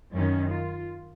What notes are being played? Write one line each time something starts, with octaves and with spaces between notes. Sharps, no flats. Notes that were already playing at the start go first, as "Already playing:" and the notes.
F#2 D#3 C#4
F4